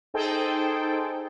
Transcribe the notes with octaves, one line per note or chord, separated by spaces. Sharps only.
D#4 G#4 A4 C5 G5